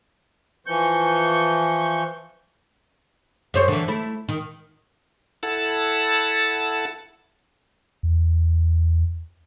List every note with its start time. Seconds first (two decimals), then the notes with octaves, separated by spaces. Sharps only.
0.67 E3 F3 C#6 G6
3.54 F#2 C5 C#5
3.68 D3 E3
3.88 A3 E4
4.29 D#3
5.43 E4 A4 F#5 A5
8.03 E2